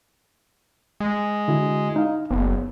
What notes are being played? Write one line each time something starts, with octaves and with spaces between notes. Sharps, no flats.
G#3
D3 E4 F#4
D#4 F5
F#1 B3